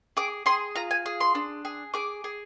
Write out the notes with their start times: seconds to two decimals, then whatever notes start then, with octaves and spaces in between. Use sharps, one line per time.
0.17 G#4 D6
0.46 G#4 C6
0.75 F4 A#5
0.91 G#5
1.06 G#4
1.21 C6
1.35 D4
1.65 G#4
1.94 G#4 D6
2.24 G#4